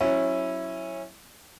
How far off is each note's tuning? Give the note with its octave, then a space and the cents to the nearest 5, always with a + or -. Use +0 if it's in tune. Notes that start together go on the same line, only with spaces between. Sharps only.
F#3 +0 C#4 -20 E4 +0